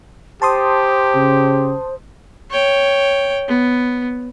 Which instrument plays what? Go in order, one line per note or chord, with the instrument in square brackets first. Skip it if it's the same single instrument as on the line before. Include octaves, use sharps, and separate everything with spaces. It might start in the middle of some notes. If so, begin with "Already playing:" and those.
[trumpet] G4 [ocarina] C5 [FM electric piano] A5 C6 D#6
[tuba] C#3
[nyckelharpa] C#5 G5
B3